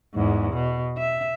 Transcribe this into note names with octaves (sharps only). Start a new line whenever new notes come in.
E2 G#2
B2
E5